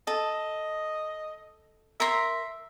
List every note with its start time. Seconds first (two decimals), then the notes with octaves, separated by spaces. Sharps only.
0.07 A4 D#5
2.00 A#4 E5 A#5 C6